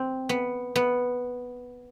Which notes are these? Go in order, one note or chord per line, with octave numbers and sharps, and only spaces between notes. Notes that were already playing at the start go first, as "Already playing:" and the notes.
Already playing: C4
B3
B3